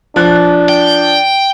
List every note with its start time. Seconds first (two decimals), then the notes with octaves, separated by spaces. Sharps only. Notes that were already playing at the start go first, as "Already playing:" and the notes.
0.16 F3 D4 F#6
0.69 G5